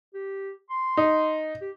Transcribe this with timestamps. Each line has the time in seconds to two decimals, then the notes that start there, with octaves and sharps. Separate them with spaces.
0.14 G4
0.70 C6
0.97 D#4
1.61 G4